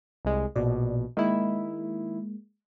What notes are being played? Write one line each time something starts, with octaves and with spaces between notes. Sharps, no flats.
C2 G#3
A#1 B2 D5
D#3 G#3 A#3 E4